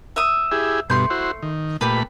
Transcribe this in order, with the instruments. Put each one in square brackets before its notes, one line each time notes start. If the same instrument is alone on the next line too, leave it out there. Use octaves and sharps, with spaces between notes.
[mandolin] E5 D#6
[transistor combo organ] E4 G4 G#4
[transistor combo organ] G2 B2 [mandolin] A3 C6 G6
[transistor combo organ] E4 F#4 C5
D#3
[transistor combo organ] A#2 A3 B5 [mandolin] G4 B4